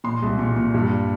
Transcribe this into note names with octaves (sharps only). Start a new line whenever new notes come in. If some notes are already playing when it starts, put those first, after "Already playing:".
A#2 C6
C2
A#2
A#2
G2